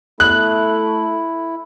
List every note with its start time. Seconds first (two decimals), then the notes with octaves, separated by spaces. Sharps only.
0.20 A3 E4 F#6